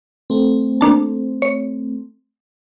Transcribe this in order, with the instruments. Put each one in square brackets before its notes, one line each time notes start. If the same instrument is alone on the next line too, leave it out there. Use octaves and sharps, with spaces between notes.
[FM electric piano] A3 C4
[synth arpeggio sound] A#3 D4 A5
C#5